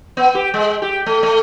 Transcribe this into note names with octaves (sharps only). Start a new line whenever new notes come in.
B3
G4
G#3
G4
A3
A3